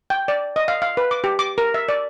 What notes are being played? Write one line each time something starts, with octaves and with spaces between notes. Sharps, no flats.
G5
D5
D#5
F5
F5
B4
D6
G4
D6
A#4
E5
D5